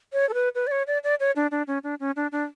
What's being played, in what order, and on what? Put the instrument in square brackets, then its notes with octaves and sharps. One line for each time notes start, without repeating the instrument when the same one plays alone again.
[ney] C#5
A4
B4
B4
D5
C#5
D5
D5
C#5
D4
D4
C#4
D4
C#4
D4
D4